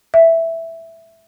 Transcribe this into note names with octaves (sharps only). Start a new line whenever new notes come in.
E5